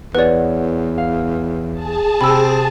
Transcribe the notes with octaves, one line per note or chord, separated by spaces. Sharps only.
E2 B4 C#5 D5 F#5
F5
G#4 A5
C3 C4 B5 E6